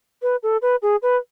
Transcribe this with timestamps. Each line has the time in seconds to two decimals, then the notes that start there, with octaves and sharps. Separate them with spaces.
0.22 B4
0.43 A4
0.62 B4
0.82 G#4
1.02 B4